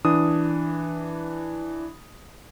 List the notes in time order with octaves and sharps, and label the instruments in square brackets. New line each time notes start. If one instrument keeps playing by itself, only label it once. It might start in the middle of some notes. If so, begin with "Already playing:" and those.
[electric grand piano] E3 D4 D#6